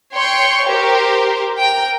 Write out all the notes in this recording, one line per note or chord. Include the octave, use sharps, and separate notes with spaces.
C#5 G5 C6 C#6
G4 A#4 C5
A#4 G5